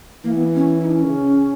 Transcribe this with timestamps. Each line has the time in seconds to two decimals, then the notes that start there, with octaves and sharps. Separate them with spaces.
0.24 E3 A#3
0.35 B3
0.55 C#4
0.78 E4
0.85 D#4
0.91 C#4
1.05 C#3